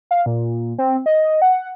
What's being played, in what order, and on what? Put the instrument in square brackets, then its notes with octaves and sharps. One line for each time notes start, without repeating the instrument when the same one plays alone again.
[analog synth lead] F5
A#2
C4
D#5
F#5